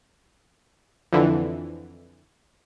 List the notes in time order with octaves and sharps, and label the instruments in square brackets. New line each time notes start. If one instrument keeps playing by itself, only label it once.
[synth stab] F2 D3 E3